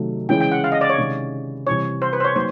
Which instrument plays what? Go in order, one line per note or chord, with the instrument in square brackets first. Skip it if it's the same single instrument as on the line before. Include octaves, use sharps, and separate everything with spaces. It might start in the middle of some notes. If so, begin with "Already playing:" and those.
Already playing: [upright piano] C3 D#3 F#3 A3
[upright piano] C#3 E3 G#3 C#4 E4 [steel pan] G5
[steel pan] G5
F#5
F5
D#5
D5
C#5
[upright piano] C3 D#3 G#3 C#4
[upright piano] C3 E3 G3 C4 [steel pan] C#5
[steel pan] C5
B4
C5
C#5
[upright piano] F#3 A#3 D#4 [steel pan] C5